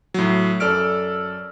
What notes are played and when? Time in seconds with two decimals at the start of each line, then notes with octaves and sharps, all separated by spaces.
0.14 A2 F#3
0.60 F#2 A4 D5 E6 F6 D7